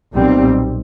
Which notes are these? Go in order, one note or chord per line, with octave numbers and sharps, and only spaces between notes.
B1 A#2 G3 C4